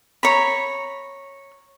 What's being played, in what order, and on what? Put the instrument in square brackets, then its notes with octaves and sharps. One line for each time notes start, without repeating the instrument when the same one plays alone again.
[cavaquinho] C#5 A#5 B5